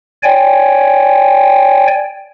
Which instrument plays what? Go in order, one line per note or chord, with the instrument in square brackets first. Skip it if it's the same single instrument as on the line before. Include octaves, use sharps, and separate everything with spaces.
[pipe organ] C#5 D5 G5 G#5